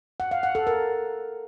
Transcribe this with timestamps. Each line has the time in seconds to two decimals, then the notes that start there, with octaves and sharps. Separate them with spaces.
0.20 F#5
0.31 F5
0.43 F#5
0.55 A4
0.67 A#4